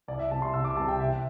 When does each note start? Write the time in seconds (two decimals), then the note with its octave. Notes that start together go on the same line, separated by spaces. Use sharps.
0.08 C2 D5
0.19 E5
0.31 C3 G3 A5
0.42 C6
0.54 C2 E6
0.64 D6
0.77 G3 A5
0.80 C3
0.88 G5
0.99 C2 E5